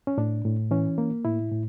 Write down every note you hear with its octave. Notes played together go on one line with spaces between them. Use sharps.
C#4
A2 D4
A2
E3 C#4
A#3
A2 E4
A2